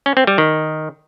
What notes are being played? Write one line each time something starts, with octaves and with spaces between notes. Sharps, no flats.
C#4
C4
G3
D#3